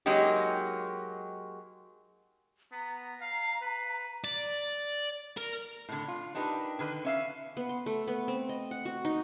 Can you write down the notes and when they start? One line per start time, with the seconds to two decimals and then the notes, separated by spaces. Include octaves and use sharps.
0.06 F#3 G#3 A#3 D#4 G4
2.72 B3 A#5
3.22 F5
3.62 B4
4.24 D5
5.37 A#4
5.89 A2 D3
6.08 F4
6.35 D4 D#4 G4 A#4 B4
6.79 D3 D#3 B4
7.05 C#4 E5 F5
7.57 B3
7.69 C6
7.86 A3
8.07 B3
8.28 C4
8.49 D#5
8.71 F#5
8.85 F#4
9.05 D#4